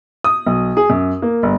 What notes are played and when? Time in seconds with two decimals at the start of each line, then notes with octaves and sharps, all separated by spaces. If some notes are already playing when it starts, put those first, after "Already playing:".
0.24 D#6
0.47 B1
0.77 G#4
0.90 F#2
1.22 A#3
1.43 G1